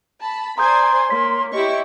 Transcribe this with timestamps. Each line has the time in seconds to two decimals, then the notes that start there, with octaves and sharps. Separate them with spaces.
0.21 A5 B5
0.58 C5 D5 G#5 A#5 C6 D#6 G6
1.09 A#3 C#5 B6
1.53 E4 G4 D#5 C#6